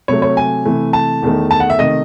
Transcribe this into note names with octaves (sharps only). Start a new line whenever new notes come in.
C3 F#3 A3 C#5
C#5
G#5
C3 E3 A3
A5
E2 D#3 A3
A5
F#5
E5
C3 D#3 A3 D#5